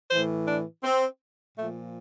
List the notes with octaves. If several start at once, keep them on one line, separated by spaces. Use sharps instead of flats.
A2 E3 C5
D4
C4
A#2 F3 A3